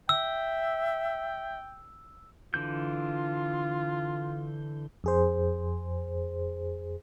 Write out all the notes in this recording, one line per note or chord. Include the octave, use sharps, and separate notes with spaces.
E5 G5 E6
D3 E3 F4 G6
F2 G#4 C5